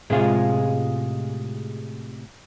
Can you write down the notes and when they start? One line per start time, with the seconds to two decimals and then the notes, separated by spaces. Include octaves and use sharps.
0.10 A2 C3 G#3 F4 G#4